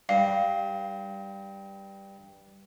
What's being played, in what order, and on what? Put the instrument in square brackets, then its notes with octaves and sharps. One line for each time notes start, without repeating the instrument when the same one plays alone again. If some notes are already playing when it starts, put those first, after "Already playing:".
[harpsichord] G2 [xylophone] F5